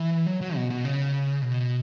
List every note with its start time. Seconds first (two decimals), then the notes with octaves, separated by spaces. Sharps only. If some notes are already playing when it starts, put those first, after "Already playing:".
Already playing: E3
0.26 F#3
0.41 F#3
0.56 B2
0.70 B2
0.85 C#3
1.42 B2